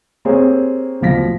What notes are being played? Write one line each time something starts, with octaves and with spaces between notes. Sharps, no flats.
A#3 C4 G4 G#4 C#5
D1 B2 F3 F5 A#6 B6